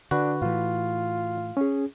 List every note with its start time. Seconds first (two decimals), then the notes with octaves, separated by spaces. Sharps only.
0.11 D3 D4 F#4 B4
0.42 A2 E3 F4
1.57 C#4 G#4